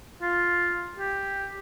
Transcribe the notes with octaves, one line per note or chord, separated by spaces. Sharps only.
F4
G4